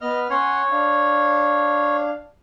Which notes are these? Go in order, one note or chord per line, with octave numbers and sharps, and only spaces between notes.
B3 D#5 F6
C#4 C#5 F#5 C6
D4 F5